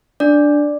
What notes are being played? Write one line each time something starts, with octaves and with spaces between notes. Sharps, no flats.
D4 D5